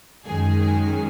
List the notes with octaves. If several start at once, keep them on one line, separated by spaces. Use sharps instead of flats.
F#2 D#3 G#3 C#4 G#4
G#4